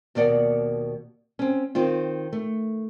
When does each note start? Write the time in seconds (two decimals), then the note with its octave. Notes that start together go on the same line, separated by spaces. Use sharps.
0.15 D#2 B2 A#3 D5 F#5
1.39 C4 C#4
1.75 D#3 C4 F4
2.33 A3